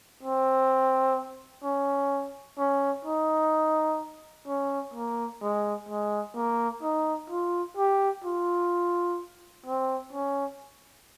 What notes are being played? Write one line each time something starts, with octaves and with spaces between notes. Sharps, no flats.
C4
C#4
C#4
D#4
C#4
A#3
G#3
G#3
A#3
D#4
F4
G4
F4
C4
C#4